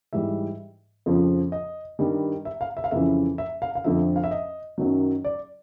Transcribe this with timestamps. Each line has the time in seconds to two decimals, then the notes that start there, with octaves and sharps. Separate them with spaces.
0.13 G#2 E3 G3 E5
1.06 F2 C#3 F3
1.52 D#5
1.99 G2 D#3 G3
2.45 E5
2.61 F5
2.77 E5
2.84 F5
2.91 F2 C#3 E3 E5
3.38 E5
3.62 F5
3.75 F5
3.84 F2 D3 F3 E5
4.16 F5
4.24 E5
4.31 D#5
4.78 F#2 D#3 F#3
5.24 D5